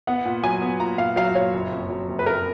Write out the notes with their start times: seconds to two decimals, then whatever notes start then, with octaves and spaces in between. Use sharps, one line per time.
0.07 B3 F#5
0.25 A#2
0.43 F#3 G#5
0.62 B3
0.80 A#2 A#5
0.98 A#2 F5
1.16 F#3 F5
1.35 A#2 C#5
1.53 F#1
1.72 F2
1.90 F#3
2.09 F#1
2.19 B4
2.26 F2 A#4